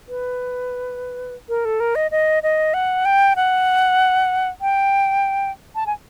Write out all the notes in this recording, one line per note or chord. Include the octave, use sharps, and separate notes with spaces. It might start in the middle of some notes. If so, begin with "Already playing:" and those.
B4
A#4
A4
A#4
D#5
D#5
D#5
F#5
G5
F#5
G5
A5
G#5